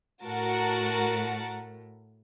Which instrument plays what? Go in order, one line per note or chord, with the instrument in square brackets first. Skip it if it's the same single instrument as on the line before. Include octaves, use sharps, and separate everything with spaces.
[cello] A2 [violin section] F#4 A#4 F#5 A5